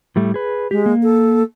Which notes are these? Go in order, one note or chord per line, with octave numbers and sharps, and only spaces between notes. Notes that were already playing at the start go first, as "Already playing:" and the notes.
A2 G3 A3
G#4 B4
G#3 G4
A#3
A4